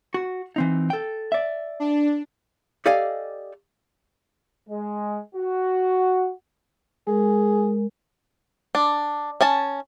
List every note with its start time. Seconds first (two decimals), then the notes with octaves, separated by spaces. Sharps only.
0.14 F#4
0.56 E3 C4 D#4
0.90 A4 G5
1.32 D5 E5
1.80 D4
2.86 G4 A4 D5 D#5 F5 G#5
4.68 G#3
5.33 F#4
7.07 G#3 G#4 A#4
8.75 D4
9.41 C#4 G#5 A5